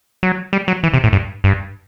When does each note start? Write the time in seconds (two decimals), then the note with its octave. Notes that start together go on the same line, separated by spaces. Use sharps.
0.23 F#3
0.53 G3
0.68 F#3
0.83 E3
0.94 C3
1.04 A2
1.13 G2
1.44 G2